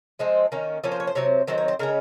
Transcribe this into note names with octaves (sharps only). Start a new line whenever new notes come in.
F3 G#3 C4 C5
D#3 A#3 C#4
F3 A#3 C#4 C#5
C5
C#5
C5
C3 F#3 C4 C#5
D#3 F#3 C4 C5
C#5
C5
C#3 G#3 C#4 A#4